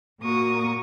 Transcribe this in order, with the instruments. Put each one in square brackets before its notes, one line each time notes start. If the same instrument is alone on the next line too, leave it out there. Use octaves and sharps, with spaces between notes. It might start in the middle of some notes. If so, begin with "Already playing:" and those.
[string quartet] A#2 A#3 F#4 C#6 D#6